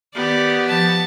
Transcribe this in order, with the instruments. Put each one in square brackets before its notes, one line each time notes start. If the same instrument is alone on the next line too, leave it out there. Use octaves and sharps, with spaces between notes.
[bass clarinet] D#3 [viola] B3 G4 [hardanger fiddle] D5
[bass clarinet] F3 [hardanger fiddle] A5